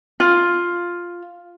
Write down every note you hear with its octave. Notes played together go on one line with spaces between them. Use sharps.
F4